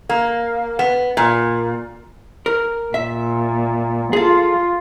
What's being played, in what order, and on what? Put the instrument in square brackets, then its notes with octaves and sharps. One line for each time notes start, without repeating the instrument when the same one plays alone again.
[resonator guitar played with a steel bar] A#3
B3
A#2
[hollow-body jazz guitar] A#4
[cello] A#2 [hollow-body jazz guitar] E5
[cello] F4 [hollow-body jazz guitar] G#4 A4